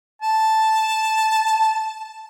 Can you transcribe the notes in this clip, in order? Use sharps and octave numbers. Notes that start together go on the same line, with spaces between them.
A5